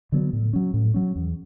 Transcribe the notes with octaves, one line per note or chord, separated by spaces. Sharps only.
D3 F#3 B3
A2
F#3 C#4
A2
F#3 C#4
E2